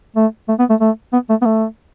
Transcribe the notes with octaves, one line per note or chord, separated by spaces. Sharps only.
A3
A3
B3
A3
A3
B3
A3
B3
A3